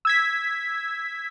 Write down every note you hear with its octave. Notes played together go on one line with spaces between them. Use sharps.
E6 G#6 B6